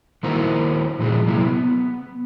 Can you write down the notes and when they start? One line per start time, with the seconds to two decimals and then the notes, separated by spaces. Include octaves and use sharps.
0.23 D#3 A#3 E4 F#4 A#4 C5
0.99 A#2 E3 F3 G#3 F#4
1.26 C3 F#3 A#3 E4
1.47 B3